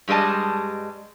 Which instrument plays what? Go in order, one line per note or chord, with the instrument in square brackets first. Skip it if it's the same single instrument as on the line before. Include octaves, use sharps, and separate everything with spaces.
[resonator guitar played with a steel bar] G2 G3 G#3 D#5 A5